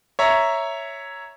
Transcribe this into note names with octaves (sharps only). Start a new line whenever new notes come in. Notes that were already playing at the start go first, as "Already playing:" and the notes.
C#5 E5 A#5